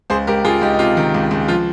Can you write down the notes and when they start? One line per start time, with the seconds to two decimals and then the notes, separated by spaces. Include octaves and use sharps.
0.10 C#2 G#4 C5
0.27 C#2 G4 A#4
0.45 C#2 F4 G#4
0.61 C#2 D#4 G4
0.73 D#4
0.79 C3 F4
0.97 D#3
1.14 C#2
1.31 C#2
1.48 F3 F4